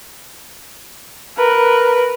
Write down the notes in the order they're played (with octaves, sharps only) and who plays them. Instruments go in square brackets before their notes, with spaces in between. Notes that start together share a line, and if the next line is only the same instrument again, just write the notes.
[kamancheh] A#4 B4